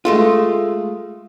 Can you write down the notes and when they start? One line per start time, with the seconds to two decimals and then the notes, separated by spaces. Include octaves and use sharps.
0.05 G#3 A3 F4